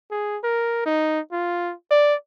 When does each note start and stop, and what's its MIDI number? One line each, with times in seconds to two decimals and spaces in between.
0.11 0.38 68
0.44 0.84 70
0.85 1.20 63
1.32 1.73 65
1.91 2.14 74